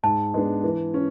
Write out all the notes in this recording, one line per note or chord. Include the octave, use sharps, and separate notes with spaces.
G#2 A5
G#3 B3 D4
E3
C#4